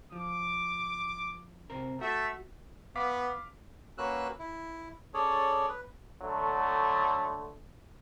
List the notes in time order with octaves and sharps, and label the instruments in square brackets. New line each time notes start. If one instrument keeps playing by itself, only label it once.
[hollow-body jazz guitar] F3 [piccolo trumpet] D6
[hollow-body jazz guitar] C3 C4 A#4
[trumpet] A3 [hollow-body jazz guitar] F#4 [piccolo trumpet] E5
[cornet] B3 [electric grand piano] F5 D6 B6
[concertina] A#3 C#4 F#4 B4 E6 F#6
E4
C#4 G#4 A4 C#5 D5
B4
[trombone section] D3 F#3 A3